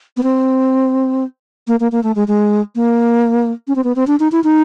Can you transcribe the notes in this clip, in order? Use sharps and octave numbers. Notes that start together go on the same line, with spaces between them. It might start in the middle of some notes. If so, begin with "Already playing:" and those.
B3
C4
A#3
A#3
A#3
A3
G#3
G#3
A#3
C#4
C4
B3
C4
D4
D#4
E4
D#4